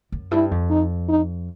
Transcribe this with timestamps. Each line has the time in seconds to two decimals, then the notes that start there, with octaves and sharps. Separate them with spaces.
0.12 F#2
0.31 G2 E4
0.51 F2
0.70 D#4
1.09 D#4